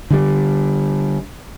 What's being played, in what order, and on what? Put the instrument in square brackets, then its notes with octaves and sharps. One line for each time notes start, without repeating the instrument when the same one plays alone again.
[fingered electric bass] D3 G3